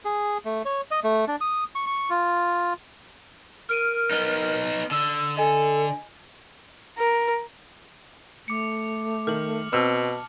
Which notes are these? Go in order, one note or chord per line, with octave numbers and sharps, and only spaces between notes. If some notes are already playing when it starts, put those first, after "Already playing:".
G#4
A3
C#5
D#5
A3
D4
D#6
C#6
C#6
F4
A#4 F6 D7 D#7
B3 D#4
D3 E6
A4 D#5 G#5
A#4
A3 D6 C#7
D#3 F6 F#7
B2 C4 A5 E6